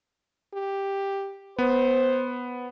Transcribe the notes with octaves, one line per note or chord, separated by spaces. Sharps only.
G4
B3 C5